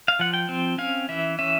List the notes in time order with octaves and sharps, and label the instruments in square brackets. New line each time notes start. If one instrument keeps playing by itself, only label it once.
[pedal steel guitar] F5
F3 F#5
G5
C4
C#4 F5
E3 E5
C#4 E5